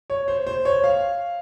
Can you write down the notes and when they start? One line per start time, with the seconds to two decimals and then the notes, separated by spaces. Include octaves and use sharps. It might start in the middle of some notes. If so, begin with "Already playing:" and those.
0.10 C#5
0.28 C5
0.47 C5
0.65 C#5
0.84 F5